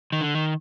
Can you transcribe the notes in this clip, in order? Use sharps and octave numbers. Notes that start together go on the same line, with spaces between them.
D#3
D3
D#3